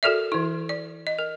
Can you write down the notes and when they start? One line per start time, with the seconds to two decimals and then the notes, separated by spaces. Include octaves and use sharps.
0.03 F#4 A4 A#4 D5 E5
0.32 E3 E4
0.69 D5
1.07 D#5
1.19 A#4